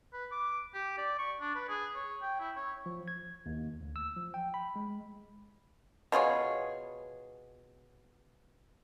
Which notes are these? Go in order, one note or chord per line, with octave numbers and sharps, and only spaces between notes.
B4
D6
G4
D5
C#6
D4
B4
G#4
C#5
G5
E4
C#5
F3
G#6
D#2
D2
E6
F3
G5
B5
G#3
B2 F4 G#4 C#5